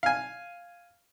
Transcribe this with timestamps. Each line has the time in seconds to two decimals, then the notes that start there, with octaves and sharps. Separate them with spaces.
0.03 F5 G#5